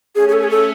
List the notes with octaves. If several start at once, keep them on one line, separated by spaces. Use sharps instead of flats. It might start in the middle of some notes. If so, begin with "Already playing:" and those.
A3 C#4 G#4
G#4
A4
G#4
A4